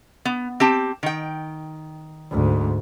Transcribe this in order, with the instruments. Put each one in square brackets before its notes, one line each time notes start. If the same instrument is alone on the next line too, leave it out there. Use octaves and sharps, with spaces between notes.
[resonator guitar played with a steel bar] B3
C4 G4 A5
D#3 G5
[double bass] D2 G#2